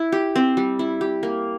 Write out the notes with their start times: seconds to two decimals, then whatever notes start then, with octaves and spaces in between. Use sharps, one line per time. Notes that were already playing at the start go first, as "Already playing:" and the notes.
Already playing: E4
0.12 G4
0.36 C4
0.57 G3
0.79 E4
1.01 G4
1.23 A#3